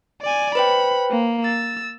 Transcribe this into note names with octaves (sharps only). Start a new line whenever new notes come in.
D5 G#5
B4 C5 G5 B5
A#3
E6 A6